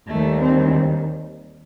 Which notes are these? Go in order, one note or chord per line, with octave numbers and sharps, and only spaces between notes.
D#2 D#3 G3 A3
C4